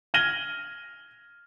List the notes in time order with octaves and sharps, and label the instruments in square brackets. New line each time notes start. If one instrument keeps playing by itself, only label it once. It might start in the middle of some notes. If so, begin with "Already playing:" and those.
[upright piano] F6 G#6 A#6 D#7 F#7 G7